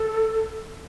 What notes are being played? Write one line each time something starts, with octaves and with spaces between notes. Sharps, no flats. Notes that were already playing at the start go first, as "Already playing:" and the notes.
Already playing: A4